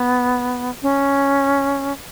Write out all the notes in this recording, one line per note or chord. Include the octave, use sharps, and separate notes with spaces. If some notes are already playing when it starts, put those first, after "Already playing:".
Already playing: B3
C#4